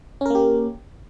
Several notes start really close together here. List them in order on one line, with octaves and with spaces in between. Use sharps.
C#4 A#4 A#3 G4